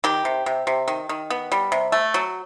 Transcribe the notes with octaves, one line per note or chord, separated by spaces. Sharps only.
D#3 G4
C3
C3
C3
D#3
D#3
B3
G3
C3
A3
F#3